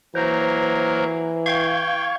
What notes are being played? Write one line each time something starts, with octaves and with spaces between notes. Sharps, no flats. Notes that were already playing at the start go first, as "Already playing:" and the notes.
E3 F#3 A#3 A#4 C5
F5 G5 C#6 G#6